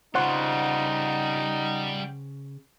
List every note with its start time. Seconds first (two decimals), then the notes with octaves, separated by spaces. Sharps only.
0.15 C#3 G3 D#4 F4 C5 F#5